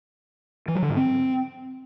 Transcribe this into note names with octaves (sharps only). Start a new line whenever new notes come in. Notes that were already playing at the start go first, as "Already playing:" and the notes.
E3
F#3
D3
G#2
C4